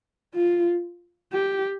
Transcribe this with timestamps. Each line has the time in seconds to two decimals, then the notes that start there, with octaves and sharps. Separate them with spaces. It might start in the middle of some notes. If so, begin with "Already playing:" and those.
0.35 F4
1.33 G4